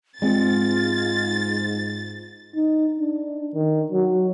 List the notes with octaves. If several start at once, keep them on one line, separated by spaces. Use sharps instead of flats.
G#2 G#3 C4 F4 A6
D#4
D4
D#3
F#3